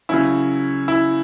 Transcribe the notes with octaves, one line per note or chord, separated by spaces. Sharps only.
C#3 F#3 C#4 E4
E4